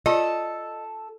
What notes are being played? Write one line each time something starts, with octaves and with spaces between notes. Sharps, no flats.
F4 A4 D5 D#5